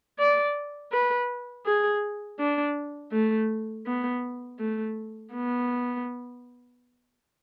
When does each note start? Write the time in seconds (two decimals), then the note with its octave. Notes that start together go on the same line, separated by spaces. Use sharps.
0.19 D5
0.92 B4
1.66 G#4
2.39 D4
3.13 A3
3.86 B3
4.59 A3
5.33 B3